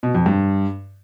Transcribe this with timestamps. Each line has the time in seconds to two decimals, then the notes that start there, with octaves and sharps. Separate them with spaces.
0.03 B2
0.15 F2
0.26 G2